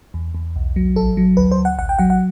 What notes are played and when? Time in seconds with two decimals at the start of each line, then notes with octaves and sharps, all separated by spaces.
0.14 E2
0.35 E2
0.56 B1
0.76 F#3
0.96 A1 A4
1.17 F#3
1.37 D2 B4
1.51 C5
1.58 D2
1.65 F#5
1.78 A1 F#5
1.89 G5
1.99 F#3 F#5
2.10 F#5